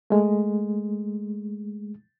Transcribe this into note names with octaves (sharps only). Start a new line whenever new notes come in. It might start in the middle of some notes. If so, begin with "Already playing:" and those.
G#3 A3